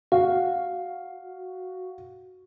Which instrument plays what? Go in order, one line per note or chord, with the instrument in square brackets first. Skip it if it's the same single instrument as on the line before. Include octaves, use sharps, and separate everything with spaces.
[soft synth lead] F#4 [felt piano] F5